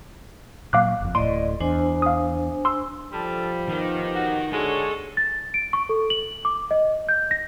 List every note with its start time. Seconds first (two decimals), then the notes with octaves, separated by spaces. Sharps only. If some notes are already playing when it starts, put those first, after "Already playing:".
0.73 A#2 F#3 A#3 F5 D6 F#6
1.01 F#1 F2
1.15 D1 A2 D5 D#5 C6
1.60 E2 D4 C5 G#5
2.02 F5 D#6
2.65 C6 E6
3.12 F3 G3 D4 A4 A5
3.69 D#3 B3 D#4 G4
4.15 F#4
4.53 D3 G#3 F#4 G4 A4 C#5
5.17 A6
5.54 D7
5.73 C#6
5.89 A4
6.10 F#7
6.45 D6
6.71 D#5
7.09 G6
7.31 A#6